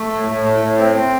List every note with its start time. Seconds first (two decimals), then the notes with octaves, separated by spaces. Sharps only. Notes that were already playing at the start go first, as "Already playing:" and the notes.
Already playing: A3
0.11 A2
0.27 A2
0.44 A3
0.61 A2
0.77 C4
0.94 C4